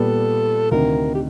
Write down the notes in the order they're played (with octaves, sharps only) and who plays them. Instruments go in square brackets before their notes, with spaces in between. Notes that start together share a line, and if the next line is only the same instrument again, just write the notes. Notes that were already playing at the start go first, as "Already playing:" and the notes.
Already playing: [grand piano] A#2 G3 B3 [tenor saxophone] A4
[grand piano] D2 C3 D#3 [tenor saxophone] A#4
[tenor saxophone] G4